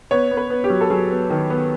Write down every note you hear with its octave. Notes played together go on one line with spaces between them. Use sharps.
B3 C#5
B3
B4
B3
G4
F#3
A4
F#3 G#4
B3
D#3
B3